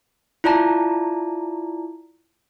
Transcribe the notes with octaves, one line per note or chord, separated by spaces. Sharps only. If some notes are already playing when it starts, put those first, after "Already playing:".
E4 F4 D5 A5 A#5